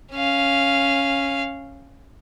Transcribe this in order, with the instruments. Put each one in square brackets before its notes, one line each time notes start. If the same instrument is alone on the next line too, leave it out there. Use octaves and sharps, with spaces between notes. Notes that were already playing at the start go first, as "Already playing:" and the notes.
[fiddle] C#4 F5